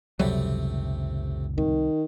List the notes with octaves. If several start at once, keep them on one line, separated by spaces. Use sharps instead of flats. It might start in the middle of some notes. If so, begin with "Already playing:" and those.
F#1 C#2 C3 F#3 G3 A3
C2 D#3